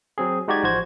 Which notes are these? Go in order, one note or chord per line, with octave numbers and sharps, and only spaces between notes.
F#3 C4 G#4
G#3 D#4 F#4 G4 D5 G#6
A1 F3 F#4 C5 G#6